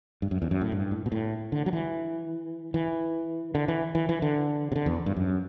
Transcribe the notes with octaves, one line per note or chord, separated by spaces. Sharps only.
G2
F#2
E2
F#2
A2
G2
A2
B2
A2
D3
F#3
E3
E3
D3
E3
E3
E3
D3
C3
D3
E2
G2
F#2